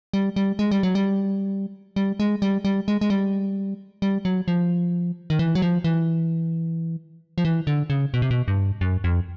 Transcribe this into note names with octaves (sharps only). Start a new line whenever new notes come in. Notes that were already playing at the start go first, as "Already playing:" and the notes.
G3
G3
G#3
G3
F#3
G3
G3
G#3
G3
G3
G#3
G#3
G3
G3
F#3
F3
D#3
E3
F#3
F3
E3
F3
E3
D3
C#3
B2
C3
B2
G2
F#2
F2